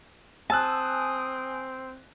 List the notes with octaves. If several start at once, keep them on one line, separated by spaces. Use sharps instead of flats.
C4 G#5 A5 D#6 E6 F#6